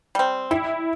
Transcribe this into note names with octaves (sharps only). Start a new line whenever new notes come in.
G3 C4
G3 E4